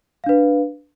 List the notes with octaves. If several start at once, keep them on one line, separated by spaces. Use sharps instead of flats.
D4 B4 F5